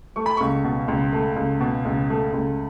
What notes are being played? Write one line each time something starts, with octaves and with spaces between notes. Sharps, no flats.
A3 C#6
B5
C#2 C#6
B2
C#2
A3
C#2
B2
C#2
A3
C#2